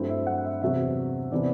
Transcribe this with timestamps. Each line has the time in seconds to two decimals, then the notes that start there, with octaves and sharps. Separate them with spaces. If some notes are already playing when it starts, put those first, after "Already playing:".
Already playing: G2 F#3 A3 C4 E4
0.09 E5
0.27 F#5
0.45 E5
0.61 E2 C3 F#3 E5
1.32 C3 E3 B3 D4 D5